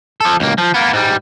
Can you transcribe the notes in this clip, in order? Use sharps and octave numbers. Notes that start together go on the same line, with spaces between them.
F3 A4
C#2 A#3
F3
A#3 B3
G#2 G3